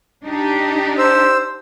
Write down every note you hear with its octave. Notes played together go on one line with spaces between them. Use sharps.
D4 D#4 G4
C5 E6